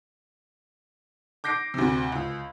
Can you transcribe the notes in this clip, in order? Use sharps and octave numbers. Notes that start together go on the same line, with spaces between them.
D6 G6 A#6 C7 D7
D2 C3
C#2